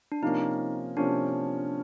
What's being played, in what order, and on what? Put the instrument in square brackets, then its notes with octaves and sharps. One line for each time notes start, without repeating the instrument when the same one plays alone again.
[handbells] D4
[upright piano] C3 F3 A#3 C#4 [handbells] D#4
[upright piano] C3 F3 A#3 C#4 [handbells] D4